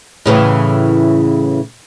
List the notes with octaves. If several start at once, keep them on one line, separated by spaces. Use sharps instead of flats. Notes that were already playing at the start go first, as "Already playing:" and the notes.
A2 C#3 E3